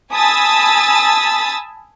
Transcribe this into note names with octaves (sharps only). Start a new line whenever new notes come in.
G#5 A5 B5 D#6 E6 A6